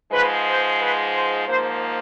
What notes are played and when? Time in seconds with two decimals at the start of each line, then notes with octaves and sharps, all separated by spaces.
0.11 G#2 F3 G#3 B4
0.46 C5
0.80 B4
1.13 C5
1.48 G#2 F3 A#3 C5